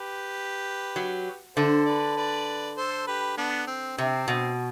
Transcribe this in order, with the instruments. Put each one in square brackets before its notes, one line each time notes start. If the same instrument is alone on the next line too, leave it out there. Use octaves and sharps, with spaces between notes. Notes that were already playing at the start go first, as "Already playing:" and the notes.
Already playing: [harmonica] G4 B4
[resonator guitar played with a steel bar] F#3
[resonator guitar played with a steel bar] D3 [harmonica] A4 C5
[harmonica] B4 D5
B4 D5
A4 C5
G4 B4
B3 D4
C4
[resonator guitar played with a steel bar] C3 [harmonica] C4
[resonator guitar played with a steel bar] B2